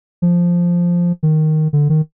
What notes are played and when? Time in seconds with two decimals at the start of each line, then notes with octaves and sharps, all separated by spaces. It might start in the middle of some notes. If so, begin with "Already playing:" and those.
0.22 F3
1.23 D#3
1.73 D3
1.90 D#3